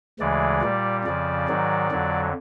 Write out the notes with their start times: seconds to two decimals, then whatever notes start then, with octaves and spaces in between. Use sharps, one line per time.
0.20 D2 C#3 E3 G#3 D5
0.62 A#2 G3
1.05 F2 C#3 F3 D5
1.48 G#2 D#3 F#3
1.91 F2 D3 F#3